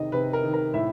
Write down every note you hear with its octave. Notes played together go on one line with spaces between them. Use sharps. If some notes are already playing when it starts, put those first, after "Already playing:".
Already playing: C3 D#3 D#5
C3 B4
A#4
D#3
A#4
A2 E5